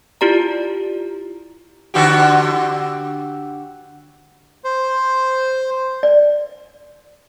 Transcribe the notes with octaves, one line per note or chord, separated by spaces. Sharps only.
E4 F4 G4 D5 A#5
D3 F#4 G4
C5
D5